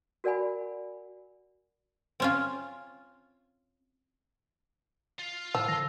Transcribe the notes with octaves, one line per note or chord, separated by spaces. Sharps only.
F#4 A#4 D5 F#5 G#5 B5
C4 C#4 F4
F4 F5
A2 F3 E6
D3 A5 A#6